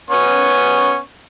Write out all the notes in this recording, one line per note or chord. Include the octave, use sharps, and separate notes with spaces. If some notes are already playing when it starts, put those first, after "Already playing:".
B3 C#4 C#6